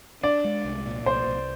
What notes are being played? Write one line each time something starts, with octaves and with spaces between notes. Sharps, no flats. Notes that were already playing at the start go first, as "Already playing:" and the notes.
D4 D5
G#3
C2
A#2
C2 C5
C2